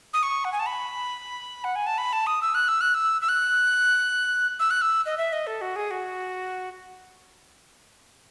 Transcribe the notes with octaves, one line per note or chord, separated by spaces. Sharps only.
D#6
C#6
F#5
G#5
A5
B5
F#5
G#5
A5
B5
A5
D#6
E6
F#6
E6
F#6
E6
E6
F#6
E6
F#6
E6
D#5
E5
D#5
A4
F#4
G#4
F#4